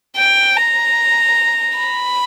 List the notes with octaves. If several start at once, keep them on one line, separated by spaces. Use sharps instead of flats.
G5
A#5
B5